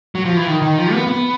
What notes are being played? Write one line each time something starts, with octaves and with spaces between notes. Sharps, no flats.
F#3
F3
E3
D#3
D#3
F3
B3
B3